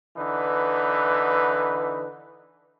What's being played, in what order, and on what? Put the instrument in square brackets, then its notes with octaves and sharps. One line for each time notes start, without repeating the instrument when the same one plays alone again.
[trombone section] D3 E3 D#4 B4